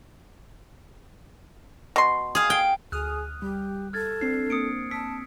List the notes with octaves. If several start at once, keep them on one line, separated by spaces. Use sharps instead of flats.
B2 C6
G#4 F5
G5
D2 G#4 D#6 F6 F#6
G3 G4
A4 F6 G#6 A6
C4 D4 C7
A#3 C4 D#6 C#7 D7
A5 E6 B6 D7